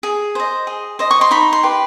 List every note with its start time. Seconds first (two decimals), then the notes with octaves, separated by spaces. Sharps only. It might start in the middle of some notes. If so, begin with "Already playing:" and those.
0.03 G#4
0.35 C5 D#5
0.67 G#4
0.99 C5 D#5
1.11 C#6
1.21 C6
1.31 D#4 B5
1.53 C6
1.63 G4 B4